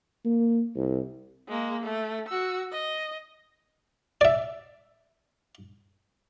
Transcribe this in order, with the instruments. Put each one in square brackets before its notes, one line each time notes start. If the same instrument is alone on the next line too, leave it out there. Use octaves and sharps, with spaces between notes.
[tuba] A#3
C2
[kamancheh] G#3 A#3
A3
F#4 E6
D#5
[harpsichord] D5 E5